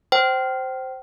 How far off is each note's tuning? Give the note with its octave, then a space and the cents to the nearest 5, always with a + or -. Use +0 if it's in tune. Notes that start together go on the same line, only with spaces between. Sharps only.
C5 +0 G5 -30